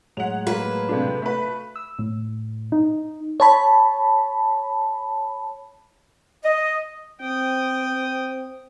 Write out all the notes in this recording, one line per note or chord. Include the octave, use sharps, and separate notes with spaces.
A2 F#3 G#3 C#5 F#5 F7
A#3 B4
C3 D4 F#4 A4 F5
A3 B4
E6
A2
D#4
C#5 A5 B5
D#5
C4 G5 D#6